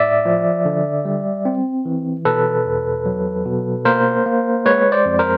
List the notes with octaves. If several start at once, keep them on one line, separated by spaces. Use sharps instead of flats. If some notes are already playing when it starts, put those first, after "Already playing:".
Already playing: A2 D5 E5
F3
D3
G3
C4
E3
B2 A4 B4
E2
F#3
B2
A#3 A#4 C5
A#3
G#3 B4 C#5
C5 D5
F2
A#4 C5